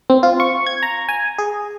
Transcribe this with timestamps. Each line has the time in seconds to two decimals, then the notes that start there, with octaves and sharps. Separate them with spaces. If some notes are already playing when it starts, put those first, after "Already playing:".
0.10 C4
0.23 F4
0.40 C#6
0.66 G#6
0.83 A#5
1.09 G#5
1.39 G#4